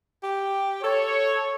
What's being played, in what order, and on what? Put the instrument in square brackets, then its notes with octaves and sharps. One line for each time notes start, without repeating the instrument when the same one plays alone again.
[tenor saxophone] G4
[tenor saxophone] A4 [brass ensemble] C#5